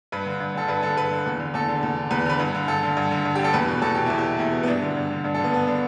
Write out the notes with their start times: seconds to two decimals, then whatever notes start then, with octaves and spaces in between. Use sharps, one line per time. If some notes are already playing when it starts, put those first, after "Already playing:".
0.12 G2 B4
0.26 D3
0.40 G2
0.54 D3 A4
0.68 G2 B4
0.82 D3 A4
0.97 G2 B4
1.11 D3
1.26 E2
1.39 D3
1.54 E2 A4
1.68 D3
1.83 E2
1.96 D3
2.11 E2 B4
2.26 D3 B4
2.40 G2
2.55 D3
2.68 G2 A4
2.83 D3
2.97 G2
3.11 D3
3.25 G2
3.35 G4
3.39 D3
3.44 A4
3.53 E2 B4
3.68 B2
3.82 E2 A4
3.95 B2 G4
4.06 E2 E4
4.18 G4
4.26 B2
4.39 E2 E4
4.53 B2
4.63 B3
4.68 G2 D4
4.82 D3
4.97 G2
5.10 D3
5.24 G2 D4
5.34 A4
5.39 D3 B3
5.53 G2 B3
5.67 D3 D4